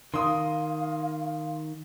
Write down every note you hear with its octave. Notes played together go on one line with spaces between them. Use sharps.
D#3 F5 C6 D#6